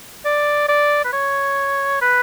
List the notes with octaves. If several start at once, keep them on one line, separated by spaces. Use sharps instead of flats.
D5
D5
B4
C#5
B4